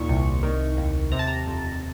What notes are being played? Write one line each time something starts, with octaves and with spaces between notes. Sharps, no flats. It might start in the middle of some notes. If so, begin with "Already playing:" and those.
Already playing: D#2 A#2 C#6
C2
D#3
D#2
C3 A#5
A5
A#5
F2